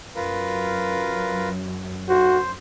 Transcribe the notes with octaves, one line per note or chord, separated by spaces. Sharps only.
F#2 F4 A#4 B4
F#4 C5